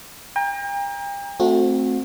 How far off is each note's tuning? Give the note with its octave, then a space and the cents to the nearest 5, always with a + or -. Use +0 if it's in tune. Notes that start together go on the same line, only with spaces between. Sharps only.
G5 +40 A#5 +20
A3 +0 C4 +0 F#4 -30